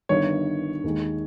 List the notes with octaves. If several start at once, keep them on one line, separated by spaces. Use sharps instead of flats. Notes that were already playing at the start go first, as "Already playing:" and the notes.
G1 G2 D#3 C#5
D#2 D#3 G#3